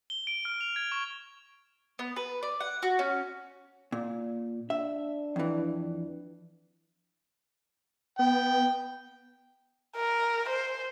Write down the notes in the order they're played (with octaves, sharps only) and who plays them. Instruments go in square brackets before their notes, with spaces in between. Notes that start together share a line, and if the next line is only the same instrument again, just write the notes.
[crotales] G7
D7
F6
F7
G#6
C#6
[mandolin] B3
B4
D5
F#5
F#4
C#4
[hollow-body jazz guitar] A#2
[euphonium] D4 [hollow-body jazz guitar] E5
[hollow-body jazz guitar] F2 E3
[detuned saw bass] B3 [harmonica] G5
[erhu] A#4
C5